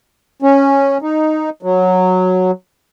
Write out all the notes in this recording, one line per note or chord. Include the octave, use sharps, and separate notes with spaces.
C#4
D#4
F#3